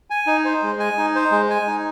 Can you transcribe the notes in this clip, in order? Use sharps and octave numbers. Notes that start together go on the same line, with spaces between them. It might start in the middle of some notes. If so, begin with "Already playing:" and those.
G#5
D#4
C5
G#3
G#5
D#4
C5
G#3
G#5
D#4